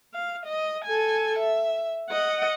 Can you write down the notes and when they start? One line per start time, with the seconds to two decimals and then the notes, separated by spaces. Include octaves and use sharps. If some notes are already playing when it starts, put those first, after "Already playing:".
0.14 F5
0.46 D#5
0.85 A4 G#5
1.39 E5
2.10 D#5 F#5